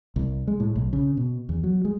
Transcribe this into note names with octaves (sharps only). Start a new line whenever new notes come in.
C2
G#3
A2
B1
C#3
B2
E2
F#3
G#3